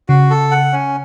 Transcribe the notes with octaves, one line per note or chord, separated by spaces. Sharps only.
C#3 F#4
A4
F#5
C#4